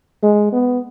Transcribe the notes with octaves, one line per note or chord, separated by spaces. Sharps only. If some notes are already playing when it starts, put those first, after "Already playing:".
G#3
B3